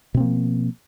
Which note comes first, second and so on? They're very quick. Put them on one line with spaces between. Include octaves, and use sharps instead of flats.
B2 C4 A#3 F3